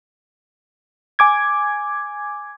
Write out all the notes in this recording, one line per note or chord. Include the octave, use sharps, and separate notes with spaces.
G#5 D6 G#6